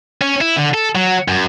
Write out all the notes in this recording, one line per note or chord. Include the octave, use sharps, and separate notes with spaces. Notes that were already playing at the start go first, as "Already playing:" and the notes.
C#4
E4
D3
A4
F#3
F#2